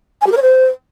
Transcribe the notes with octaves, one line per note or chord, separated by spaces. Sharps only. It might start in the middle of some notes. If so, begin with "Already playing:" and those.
G#5
G4
A#4
C#5
C5